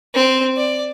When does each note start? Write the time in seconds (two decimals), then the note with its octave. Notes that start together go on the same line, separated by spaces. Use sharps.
0.15 C4
0.57 D5